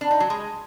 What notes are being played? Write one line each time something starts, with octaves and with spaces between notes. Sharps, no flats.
D4
D#4
F#3
G#3